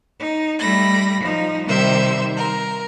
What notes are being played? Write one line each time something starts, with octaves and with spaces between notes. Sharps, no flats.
D#4
G3 A3 B5 A#6
F3 D#4
C3 D#3 G3 C5 E5 E6
A#4